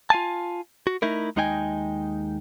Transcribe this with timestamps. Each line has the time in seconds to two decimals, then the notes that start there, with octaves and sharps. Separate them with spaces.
0.10 F4 F5 G#5 A5
0.87 F#4
1.02 A3 D#4 E4 A#4
1.36 D#2 G#3 D#4 D#5 G5 G#5